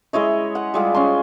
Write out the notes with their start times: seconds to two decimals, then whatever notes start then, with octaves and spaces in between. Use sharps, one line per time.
0.13 G#3 E4 C#5 D#5
0.55 F#5
0.74 G3 G#3 F4
0.94 C#4 C6